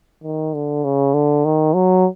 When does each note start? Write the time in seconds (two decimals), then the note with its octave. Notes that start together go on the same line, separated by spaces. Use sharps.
0.23 D#3
0.54 D3
0.84 C#3
1.14 D3
1.45 D#3
1.75 F#3